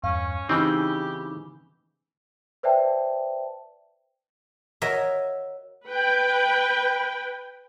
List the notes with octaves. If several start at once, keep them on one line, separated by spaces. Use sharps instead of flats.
E2 G2 C#4 F5
C#3 E3 C4 D#4 G4 B5
B4 C5 D5 E5 G5 A5
F#4 A#4 C#5 D#5 E5
B4 G5